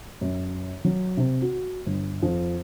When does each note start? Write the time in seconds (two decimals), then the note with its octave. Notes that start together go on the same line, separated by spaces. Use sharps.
0.21 F#2
0.85 F#3
1.17 C3
1.42 F#4
1.86 G1
2.23 F2